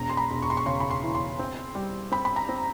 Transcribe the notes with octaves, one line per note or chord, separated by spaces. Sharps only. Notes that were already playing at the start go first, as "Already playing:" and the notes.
Already playing: E1 A#5
C6
B5
E1
C#6
C6
C#6
C#3 C6
B5
C6
E3
C6
C4
G3
C4 B5
B5
A#5
C4